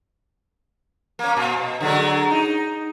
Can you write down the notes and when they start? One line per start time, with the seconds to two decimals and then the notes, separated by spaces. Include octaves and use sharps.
1.19 A#3 C#4
1.37 A#2
1.58 B2
1.81 D3 F#3 G#3
2.30 D#4